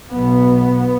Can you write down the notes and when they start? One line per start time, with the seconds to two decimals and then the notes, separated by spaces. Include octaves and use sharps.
0.12 B1 B2 B3